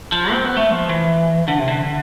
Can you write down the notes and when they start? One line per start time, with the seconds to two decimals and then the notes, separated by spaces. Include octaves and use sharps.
0.12 F3
0.32 C4
0.44 B3
0.57 A3
0.70 F3
0.89 E3
1.48 D3
1.58 C3
1.68 D3